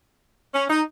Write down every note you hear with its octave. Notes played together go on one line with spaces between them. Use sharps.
C#4
D#4